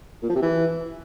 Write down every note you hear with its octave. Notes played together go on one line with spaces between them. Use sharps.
A#2
F3
C3
E3